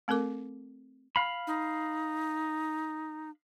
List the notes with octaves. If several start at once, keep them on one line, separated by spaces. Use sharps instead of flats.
A3 C4 A4 A#4 D6
F5 B5
D#4